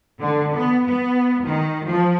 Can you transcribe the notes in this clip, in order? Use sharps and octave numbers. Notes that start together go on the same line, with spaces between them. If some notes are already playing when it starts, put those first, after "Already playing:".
D3
B3
B3
D#3
F3